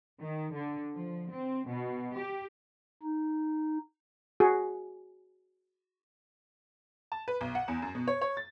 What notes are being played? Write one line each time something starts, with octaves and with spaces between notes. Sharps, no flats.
D#3
D3
F3
C4
B2
G4
D#4
F#4 G#4
A5
B4
B1
F#5
E2
F#2
B2
C#5
C#5
A6